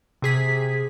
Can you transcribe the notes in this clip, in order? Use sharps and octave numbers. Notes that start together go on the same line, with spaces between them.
C3 G#4 B6